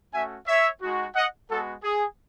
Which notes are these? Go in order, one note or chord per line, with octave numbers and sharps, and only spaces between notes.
A3 C#4 F#4 E5 G#5
C#5 E5
G#3 D#4 F#4
D#5 F#5
G#3 B3 F#4 A4
G#4